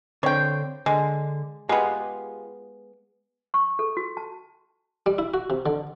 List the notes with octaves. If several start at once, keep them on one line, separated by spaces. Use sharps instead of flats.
D3 C4 C#5 G5
D3 G#3
G#3 B3 F4 G4 G#4
C#6
A4
F#4
A5
G3
E4
F#4
C3
D3